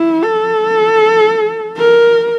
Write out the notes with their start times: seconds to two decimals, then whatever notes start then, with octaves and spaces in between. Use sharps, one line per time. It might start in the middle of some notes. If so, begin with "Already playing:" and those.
Already playing: E4
0.23 A4
1.78 A#4